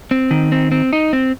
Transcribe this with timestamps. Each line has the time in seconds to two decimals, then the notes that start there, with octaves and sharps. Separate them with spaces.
0.11 C4
0.31 D#3
0.52 C4
0.72 C4
0.93 D#4
1.13 C4